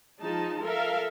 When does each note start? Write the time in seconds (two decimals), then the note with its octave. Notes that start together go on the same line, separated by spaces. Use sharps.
0.19 F3 G#3 D#4 G#4 A5
0.62 A4 A#4 E5 F5